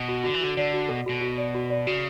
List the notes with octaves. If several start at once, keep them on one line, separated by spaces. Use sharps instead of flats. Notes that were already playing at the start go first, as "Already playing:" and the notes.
Already playing: B2
F#4
D3 F#4
E3
D3 F#4
D3 D5
F#4
B2 A4
B2 F#4
F#4
D5
F#4
D5
C#3 F#4